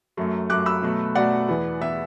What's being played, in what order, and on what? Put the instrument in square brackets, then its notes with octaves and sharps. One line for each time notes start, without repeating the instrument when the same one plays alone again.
[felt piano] F#2 F#3 A3
F#2 F#3 A3 D6 F#6
B5 E6
B2 F#3 A3
B2 F#3 A3 D5 F#5
E2 E3 B3
E3 B3 E5